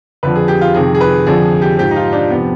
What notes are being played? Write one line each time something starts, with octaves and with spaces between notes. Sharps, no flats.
F2 D3 F3 B4
G#4
G4
F4
F2 C3 D#3 G#4
G#4
B4
F2 D3 F3 G#4
G4
G#2 F3 G4
D#4
F4
D4
F2 C3 F3 B3